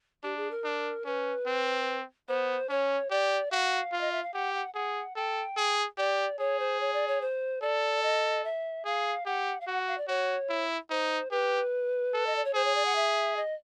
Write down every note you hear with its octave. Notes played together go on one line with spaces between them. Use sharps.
D4 G4
G#4
A#4
D4
C#4 B4
C4
B3 C5
C#4 C#5
G4 D5
F#4 F5
F4
D#5
E5
F5
G4 F#5
F#5
G#4 F#5
A4 G5
G#4
G4 D5
G#4 C#5
C5
C#5
D5
C#5
C5
A4 D5
D#5
E5
G#4 F5
G4 F#5
F5
F#4 F#5
F5
D5
F#4 C#5
E4
D#4 C5
G4 B4
A4
D#5
D5
C#5
G#4 C5
C#5
D5
F#5
E5
D#5